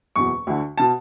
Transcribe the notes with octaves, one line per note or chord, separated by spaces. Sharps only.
F#1 E2 B2 C#6
D2 D3
B2 A5